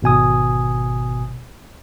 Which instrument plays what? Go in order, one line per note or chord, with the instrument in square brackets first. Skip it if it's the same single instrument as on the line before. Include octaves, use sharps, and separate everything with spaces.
[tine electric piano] G#1 B2 G#5 D#6